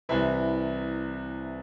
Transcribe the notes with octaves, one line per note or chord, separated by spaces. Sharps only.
C2 C3 E3 E4